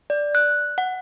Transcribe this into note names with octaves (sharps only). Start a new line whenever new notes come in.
D5
F#6
F#5